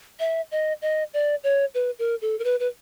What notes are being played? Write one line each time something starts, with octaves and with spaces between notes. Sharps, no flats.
E5
D#5
D#5
D5
C#5
B4
A#4
A4
A#4
B4
B4